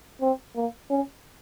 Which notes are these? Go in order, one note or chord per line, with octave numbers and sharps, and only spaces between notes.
C4
A#3
C#4